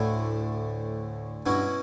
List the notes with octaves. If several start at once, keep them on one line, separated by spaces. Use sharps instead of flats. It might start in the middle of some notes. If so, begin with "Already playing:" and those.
Already playing: D2 A2 D3 A3 E4
G2 B2 F#3 C#4 E4